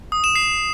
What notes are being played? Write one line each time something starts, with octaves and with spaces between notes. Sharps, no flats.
D#6
E7
C7